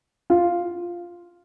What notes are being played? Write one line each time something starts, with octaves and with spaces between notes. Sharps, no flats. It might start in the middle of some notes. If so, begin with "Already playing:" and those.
F4